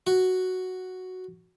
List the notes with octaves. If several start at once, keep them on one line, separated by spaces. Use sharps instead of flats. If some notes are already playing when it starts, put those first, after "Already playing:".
F#4